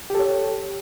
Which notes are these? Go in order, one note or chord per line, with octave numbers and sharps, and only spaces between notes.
G4 A4 C#5